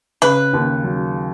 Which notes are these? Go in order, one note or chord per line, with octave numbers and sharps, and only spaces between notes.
C#3 B4
D#2
F#3